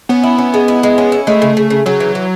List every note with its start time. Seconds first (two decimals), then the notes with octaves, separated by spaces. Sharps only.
0.09 B3 C#4
0.23 E4
0.38 C#4
0.54 G#3
0.68 E4
0.83 G#3
0.98 C#4
1.12 E4
1.27 G#3 A3
1.42 C#3
1.57 C#3
1.70 C#3
1.86 C#3 F#3
2.00 E3
2.15 E3